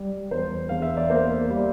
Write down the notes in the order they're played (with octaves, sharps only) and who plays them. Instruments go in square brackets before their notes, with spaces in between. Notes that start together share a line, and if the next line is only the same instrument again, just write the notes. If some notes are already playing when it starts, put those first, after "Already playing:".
Already playing: [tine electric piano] G3
[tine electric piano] E2 [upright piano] C5
[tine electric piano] E2 [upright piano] F5
[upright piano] E5
D5
[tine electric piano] A#3 [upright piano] C5
[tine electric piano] G3